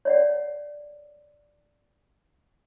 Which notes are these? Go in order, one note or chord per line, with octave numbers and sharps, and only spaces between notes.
C#5 D5 F#5